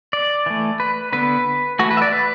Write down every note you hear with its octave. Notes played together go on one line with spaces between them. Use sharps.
D5
E3 A3
B4
D3 B3 B4
E3 A3 F#4
B4
E5
D5
B4